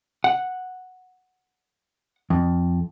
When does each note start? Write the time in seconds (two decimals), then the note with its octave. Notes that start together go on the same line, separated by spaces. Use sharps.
0.24 F#5
2.30 F2